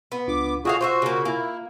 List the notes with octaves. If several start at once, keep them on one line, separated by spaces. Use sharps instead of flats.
B3
C#2 D4 F4 D6
D3 F4 F#4 G#4 E5 F5
F#4 C5 D#5 E5
C#3 A#3
A#3 E4